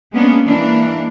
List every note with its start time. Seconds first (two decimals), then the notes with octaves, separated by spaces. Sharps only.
0.13 G#3 A#3 B3 C#4 D4
0.45 E3 G#3 A#3 D4